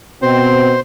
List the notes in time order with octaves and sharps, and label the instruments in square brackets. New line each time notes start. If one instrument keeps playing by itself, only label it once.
[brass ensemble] B2 [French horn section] C4 [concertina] C5